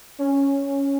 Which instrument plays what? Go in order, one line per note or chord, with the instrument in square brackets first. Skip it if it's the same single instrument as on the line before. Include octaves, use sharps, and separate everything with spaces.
[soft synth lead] C#4